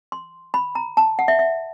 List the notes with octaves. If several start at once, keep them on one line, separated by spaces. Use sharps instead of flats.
C6
B5
A#5
A5
F#5
E5
E5